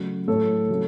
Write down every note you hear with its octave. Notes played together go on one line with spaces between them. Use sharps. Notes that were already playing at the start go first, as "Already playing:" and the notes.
Already playing: C#3 F#3 A3
A2 F#3 A3 A4 C#5
C#3 F#3 A3